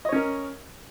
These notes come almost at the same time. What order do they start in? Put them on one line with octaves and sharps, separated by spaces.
D#5 C#5 C#4 A#4